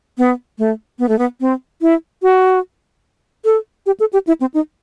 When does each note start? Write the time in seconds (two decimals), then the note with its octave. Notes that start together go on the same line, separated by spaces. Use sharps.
0.18 B3
0.59 A3
0.99 B3
1.09 A3
1.19 B3
1.41 C4
1.82 E4
2.22 F#4
3.45 A4
3.86 G4
4.00 A4
4.13 G4
4.27 E4
4.41 C4
4.54 D#4